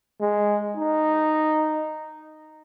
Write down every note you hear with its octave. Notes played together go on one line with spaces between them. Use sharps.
G#3
D#4